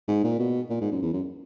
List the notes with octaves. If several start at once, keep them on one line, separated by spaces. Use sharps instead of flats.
G#2
A#2
B2
A#2
G#2
F#2
E2
F#2